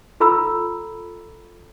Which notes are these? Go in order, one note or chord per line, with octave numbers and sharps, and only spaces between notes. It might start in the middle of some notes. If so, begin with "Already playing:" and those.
F4 A4 A#5 B5 E6